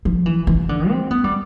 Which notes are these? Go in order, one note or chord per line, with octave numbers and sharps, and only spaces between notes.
F3
E3
E3
D3
C4
B3
G3